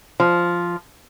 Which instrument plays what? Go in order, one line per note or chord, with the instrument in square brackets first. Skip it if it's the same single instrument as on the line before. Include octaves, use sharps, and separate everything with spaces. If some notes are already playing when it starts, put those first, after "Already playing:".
[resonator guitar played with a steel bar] F3